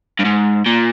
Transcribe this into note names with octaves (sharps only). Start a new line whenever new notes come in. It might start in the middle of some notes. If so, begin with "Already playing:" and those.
G2
G#2
A#2